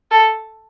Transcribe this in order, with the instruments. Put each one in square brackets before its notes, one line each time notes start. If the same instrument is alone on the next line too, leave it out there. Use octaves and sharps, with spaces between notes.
[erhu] A4